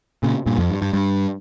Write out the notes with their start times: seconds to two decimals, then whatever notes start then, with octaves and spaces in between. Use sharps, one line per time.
0.23 A#2 C#3
0.46 G2 A#2
0.58 F2
0.71 G2
0.82 G2
0.93 G2